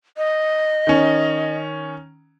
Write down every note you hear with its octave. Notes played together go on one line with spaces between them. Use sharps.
D#5
D#3 C#4